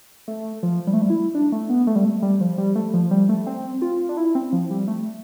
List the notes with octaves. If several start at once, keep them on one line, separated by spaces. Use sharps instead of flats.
A3
F3
G3
A3
G3
E4
D4
A3
B3
A3
G3
A3
G3
F3
G3
A3
F3
G3
A3
C4
F4
D4
E4
C4
F3
G3
A3